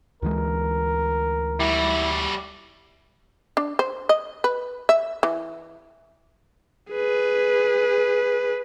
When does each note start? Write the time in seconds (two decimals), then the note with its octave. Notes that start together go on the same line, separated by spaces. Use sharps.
0.22 D2 E3 G#3 A#4
1.60 G3 E4 F#4
3.57 D4
3.79 C5
4.09 D#5
4.44 B4
4.89 E5
5.23 E3
6.92 G#4 B4